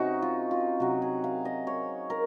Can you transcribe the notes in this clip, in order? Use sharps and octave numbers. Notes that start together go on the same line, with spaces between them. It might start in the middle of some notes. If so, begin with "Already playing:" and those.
Already playing: C3 C#4 D#4 F#4
F4
F4
C3 F#3 F#4
G#4
F5
D#5
C#5
A#4